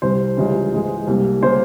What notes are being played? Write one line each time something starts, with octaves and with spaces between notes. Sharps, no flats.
C2 C3 G3 C5
C#2 C#3 E3 G3
G#2 E3 G#3
C2 C3 G3 A#3
C#3 G3 A#3 C5